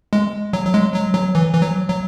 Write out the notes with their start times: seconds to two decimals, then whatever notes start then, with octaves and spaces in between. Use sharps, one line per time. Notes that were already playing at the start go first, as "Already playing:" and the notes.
0.13 G#3
0.53 F#3
0.66 F#3
0.74 G#3
0.94 F#3
1.14 F#3
1.35 E3
1.54 E3
1.61 F#3
1.89 F#3